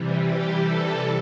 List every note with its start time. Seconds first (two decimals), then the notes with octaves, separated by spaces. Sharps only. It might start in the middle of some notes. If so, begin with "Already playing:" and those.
Already playing: C3 E3 G3
0.20 G4
0.60 A4